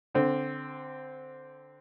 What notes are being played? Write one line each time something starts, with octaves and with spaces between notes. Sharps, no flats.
D3 C4